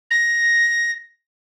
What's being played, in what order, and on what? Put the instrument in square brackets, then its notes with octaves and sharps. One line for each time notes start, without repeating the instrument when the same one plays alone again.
[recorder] A#6